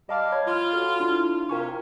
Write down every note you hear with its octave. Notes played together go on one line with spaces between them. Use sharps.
G3 D#5 F5 A5 D6
C#5 B5 G#6
F4
F#4 A4
D4 E4
C3 F4 A#4 G#5 C#6